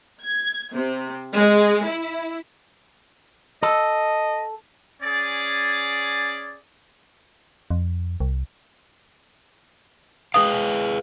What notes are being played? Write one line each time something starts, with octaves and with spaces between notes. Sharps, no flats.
G#6
C3
G#3
E4
A4 D#5
C#4 G#4 D5
F2
C2
G#4 B4 F5 D#6